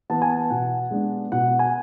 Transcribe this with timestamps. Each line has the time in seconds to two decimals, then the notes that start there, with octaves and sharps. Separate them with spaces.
0.10 E3 B3 A5
0.22 G#5
0.30 A5
0.50 B2 F#5
0.91 G#3 B3 D4
1.32 B2 F#5
1.59 G#5